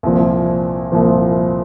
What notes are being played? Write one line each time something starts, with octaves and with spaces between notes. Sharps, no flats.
C2 A#2 F3
C2 A#2 F3